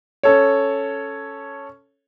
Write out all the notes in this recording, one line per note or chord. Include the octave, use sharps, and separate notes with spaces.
C#4 A4 C#5